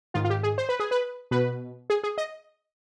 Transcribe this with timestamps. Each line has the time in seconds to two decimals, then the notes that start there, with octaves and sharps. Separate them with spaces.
0.14 G#2 D#3 F4
0.25 F4
0.30 G4
0.43 G#4
0.58 C5
0.69 B4
0.80 G#4
0.91 B4
1.31 B2 B4
1.90 G#4
2.04 G#4
2.18 D#5